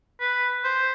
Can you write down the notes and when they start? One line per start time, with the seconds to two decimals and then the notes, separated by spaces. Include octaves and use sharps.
0.20 B4
0.64 C5